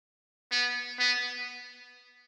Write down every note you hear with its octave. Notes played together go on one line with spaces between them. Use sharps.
B3
B3